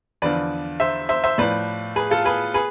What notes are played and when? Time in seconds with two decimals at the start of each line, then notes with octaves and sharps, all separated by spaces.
0.22 E2 D3 F3 B4 D5
0.80 C5 E5
1.09 C5 E5
1.24 C5 E5
1.38 A2 F3 B4 D5
1.96 G#4 B4
2.11 F4 A4
2.25 G#4 B4
2.54 G#4 B4